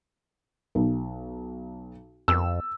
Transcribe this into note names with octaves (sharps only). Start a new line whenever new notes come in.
B1
F2 E6